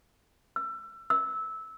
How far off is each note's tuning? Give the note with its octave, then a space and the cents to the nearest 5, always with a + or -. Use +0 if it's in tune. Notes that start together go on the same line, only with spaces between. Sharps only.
E6 +25
E6 -15